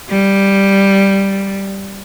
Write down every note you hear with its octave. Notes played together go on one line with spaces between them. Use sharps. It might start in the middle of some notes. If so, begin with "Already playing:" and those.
G3